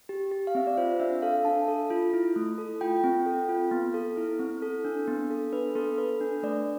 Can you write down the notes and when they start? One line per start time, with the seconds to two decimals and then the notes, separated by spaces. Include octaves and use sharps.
0.09 G4
0.31 G4
0.47 F5
0.55 C4 E5
0.67 D5
0.77 F4 C5
1.00 D4 E5
1.22 A4 F5
1.45 D4 A5
1.68 A4
1.90 F4
2.13 E4
2.36 A3
2.58 A4
2.81 F4 G5
3.04 C4
3.26 A4
3.49 F4
3.71 B3
3.94 A4
4.17 E4
4.39 C4
4.62 A4
4.85 D4
5.08 B3
5.30 A4
5.53 D4 B4
5.75 B3 A4
5.98 A4 B4
6.21 D4
6.43 A3 D5